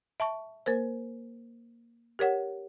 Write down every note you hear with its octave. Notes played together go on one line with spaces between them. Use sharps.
E5 A5 C#6
A#3 A#4 C5
G4 A#4 C#5 F#5